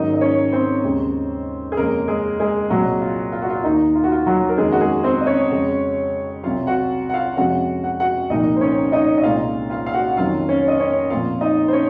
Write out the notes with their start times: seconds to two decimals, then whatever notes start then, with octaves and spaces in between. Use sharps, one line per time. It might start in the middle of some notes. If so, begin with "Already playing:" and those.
Already playing: G#2 D#3 F#3 A#3 C#4 D#4 D#5
0.13 D#5
0.21 C#4 C#5
0.52 C4 C5
0.84 D#2 C#3 G#3 C#4
1.72 G#4
1.77 F2 C#3 G#3 A#3 C#4 A#4
2.08 G#3 G#4
2.40 G#3 G#4
2.70 C2 A#2 F#3 G#3 C4 F#4
3.01 F4
3.32 F4
3.42 F#4
3.50 F4
3.64 D#2 D#3 A#3 D#4
3.95 F4
4.04 F#4
4.12 F4
4.26 F#3 F#4
4.49 A#4
4.57 F2 D#3 G#3 A#3 C#4 G#4
4.72 F#4
4.81 G#3 G#4
5.03 C4 C5
5.21 D#5
5.27 C#4 C#5
5.51 F2 C#3 G#3
6.43 C2 C3 F#3 F4 F5
6.67 F#4 F#5
7.10 F#5
7.13 F4 F5
7.37 F2 C3 F3 G#3 C#4 F#4 F#5
7.84 F#5
8.00 F#4 F#5
8.30 C2 A#2 F3 A#3 D#4 D#5
8.56 C5
8.61 C#4 C#5
8.92 D#4 D#5
9.18 D#5
9.24 C2 A#2 G#3 C#4 F4 F5
9.70 F4 F5
9.86 F5
9.94 F#4 F#5
10.10 F#5
10.17 F2 D#3 F#3 C#4 F4 F5
10.49 C#4 C#5
10.68 D#5
10.79 C#4 C#5
11.10 A#2 F3 C4 F4 F5
11.41 D#4 D#5
11.68 C5
11.73 C#4 C#5